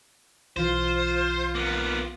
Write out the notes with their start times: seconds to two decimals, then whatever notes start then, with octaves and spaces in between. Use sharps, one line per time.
0.56 B1 E3 F4 C5
1.55 A#3 B3